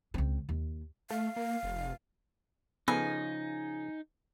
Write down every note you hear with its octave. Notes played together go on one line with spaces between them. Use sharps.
C#2 C4
D#2
A3 F5
A#3
F1
C#3 F3 B3 D#4 G#4 A4 B4 G#5